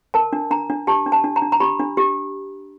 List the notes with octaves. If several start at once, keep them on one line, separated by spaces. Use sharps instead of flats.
A#4 A5
D4
D4 A#5
D4
G4 A5
D4
A5
D4
A#5
D4
A#5
G4 B5
D4
G4